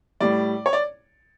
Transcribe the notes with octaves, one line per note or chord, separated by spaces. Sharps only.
A2 G3 D5
C#5
D5